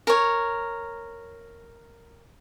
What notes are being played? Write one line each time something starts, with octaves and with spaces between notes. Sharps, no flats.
A#4 C#5